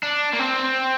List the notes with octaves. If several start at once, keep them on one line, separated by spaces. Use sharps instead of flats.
D4
A#3
C4